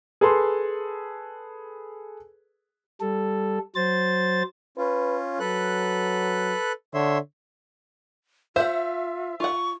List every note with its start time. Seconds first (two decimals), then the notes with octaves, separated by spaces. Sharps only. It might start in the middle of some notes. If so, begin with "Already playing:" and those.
0.21 G#4 A4 B4 C6
3.01 G3 A4
3.75 F#3 C5 A6
4.78 C#4 F4 B4
5.40 F#3 A4 B4 F#6
6.94 D3 C#5 E5 C6
8.56 F4 C5 E5 F#5
9.40 F4 F#5 C#6